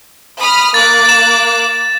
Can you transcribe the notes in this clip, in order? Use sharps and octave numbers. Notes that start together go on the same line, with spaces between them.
B5 D#6 F6
A#3 D6 F#6 A6
A6 E7